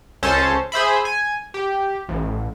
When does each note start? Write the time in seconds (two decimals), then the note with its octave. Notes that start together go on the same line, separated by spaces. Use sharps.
0.23 C#2 C#4 A4 C5 A5
0.72 G#4 C5 E5 B5
1.05 G#5
1.54 G4
2.09 A1